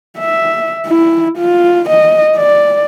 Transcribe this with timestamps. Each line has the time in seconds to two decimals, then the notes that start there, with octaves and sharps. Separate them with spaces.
0.19 E5
0.87 E4
1.38 F4
1.89 D#5
2.37 D5